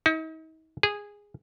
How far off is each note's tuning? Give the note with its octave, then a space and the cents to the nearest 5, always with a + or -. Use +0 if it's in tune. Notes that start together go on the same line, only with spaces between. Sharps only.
D#4 +40
G#4 -10